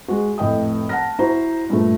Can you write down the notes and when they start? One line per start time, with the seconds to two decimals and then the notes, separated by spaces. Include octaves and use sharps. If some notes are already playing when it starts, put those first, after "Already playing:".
0.08 G#3 F#4
0.38 F1 A2 D#5 G5 D#6
0.89 F#5 A5 F6 A#6
1.19 E4 F#4 C5 A#5
1.70 G2 A#2 A3